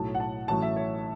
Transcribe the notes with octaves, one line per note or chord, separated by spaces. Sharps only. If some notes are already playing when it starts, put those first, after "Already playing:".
Already playing: B1 A2 F#3 A3 A5
F#5
A5
A1 A2 F#3 A3 A5
E5
C#5